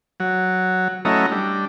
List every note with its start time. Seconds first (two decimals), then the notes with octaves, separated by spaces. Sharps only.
0.20 F#3
1.05 F#3 A3 C#4 E4 D#5 A#5
1.31 G3 D4